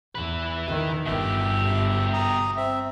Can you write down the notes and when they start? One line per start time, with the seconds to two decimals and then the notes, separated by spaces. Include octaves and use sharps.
0.15 E2 E4 B4
0.67 D#3
1.06 G1 B2 G4 E5
2.13 A#5 D#6
2.57 C4 E5